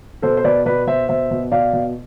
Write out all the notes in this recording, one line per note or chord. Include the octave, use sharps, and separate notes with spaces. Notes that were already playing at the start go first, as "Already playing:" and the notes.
B2 A4 C5
C5
B2 B4 D5
B2 B4 D5
B2 C5 E5
B2 C5 E5
B2
B2 D5 F5
B2